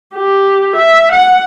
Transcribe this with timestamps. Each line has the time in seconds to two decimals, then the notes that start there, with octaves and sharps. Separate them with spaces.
0.16 G4
0.77 E5
1.13 F#5